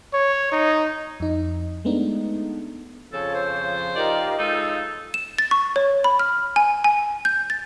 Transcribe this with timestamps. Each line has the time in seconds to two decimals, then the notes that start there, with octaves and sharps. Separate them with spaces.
0.13 C#5
0.52 D#4
1.20 F2 D#4
1.85 G#3 A3 B3 D4 D#4
3.12 F2 C#3 F3 A4 C#5
3.34 C5
3.96 D#4 F4 G4 A#4 D5 D#5
4.39 G#3 D#4 F4 A4 E6 G6
5.14 E7
5.38 A6
5.51 C#6
5.76 C#5
6.04 B5
6.19 F6
6.56 G#5
6.84 G#5
7.25 G6
7.50 A6